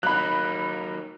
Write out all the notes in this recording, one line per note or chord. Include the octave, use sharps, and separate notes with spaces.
F#3 A#3 D#4 B5 F#6